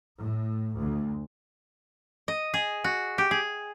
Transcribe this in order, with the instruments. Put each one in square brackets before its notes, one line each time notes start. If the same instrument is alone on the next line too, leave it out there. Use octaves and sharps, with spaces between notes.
[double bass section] A2
D2
[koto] D#5
G#4
F#4
G4
G#4